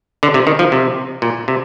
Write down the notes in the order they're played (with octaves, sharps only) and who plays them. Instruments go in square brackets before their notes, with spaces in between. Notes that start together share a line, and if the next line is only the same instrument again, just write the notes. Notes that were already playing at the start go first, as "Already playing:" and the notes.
[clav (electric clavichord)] D3
C3
D#3
F3
C3
A#2
C3